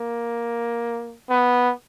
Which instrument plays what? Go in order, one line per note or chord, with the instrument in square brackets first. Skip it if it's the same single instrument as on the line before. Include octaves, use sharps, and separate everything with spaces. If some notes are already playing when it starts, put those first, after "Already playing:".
Already playing: [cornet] A#3
B3